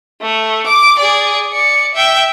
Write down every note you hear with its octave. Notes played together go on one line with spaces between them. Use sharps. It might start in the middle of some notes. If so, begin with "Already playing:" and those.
A3
D6
G#4 D5
D5 C#7
E5 G5